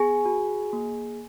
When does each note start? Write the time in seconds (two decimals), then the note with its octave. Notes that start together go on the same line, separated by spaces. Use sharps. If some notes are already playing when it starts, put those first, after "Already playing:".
Already playing: B3 G#4 G#5
0.26 F#4
0.73 A#3